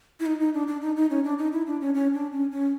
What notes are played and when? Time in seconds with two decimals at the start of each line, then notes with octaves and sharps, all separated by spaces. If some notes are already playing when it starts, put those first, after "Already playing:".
0.20 E4
0.26 D#4
0.40 D#4
0.54 D4
0.67 D4
0.82 D#4
0.96 D#4
1.10 C#4
1.24 D4
1.38 D#4
1.52 E4
1.67 D4
1.81 C#4
1.94 C#4
2.14 D4
2.32 C#4
2.52 C#4